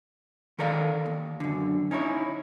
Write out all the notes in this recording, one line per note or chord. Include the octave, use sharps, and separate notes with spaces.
D#3 A4 A#4 D5 F5
D#2
F#2 D3
C#4 D#4 E4 C#5